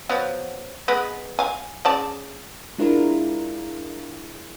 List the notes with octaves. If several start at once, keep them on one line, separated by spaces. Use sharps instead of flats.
F3 F#3 B3
G#3 B3 B4
F5 G#5
C#3 D5 A5
G#3 D4 E4 F4 A#4